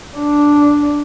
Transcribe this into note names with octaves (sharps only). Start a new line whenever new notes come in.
D4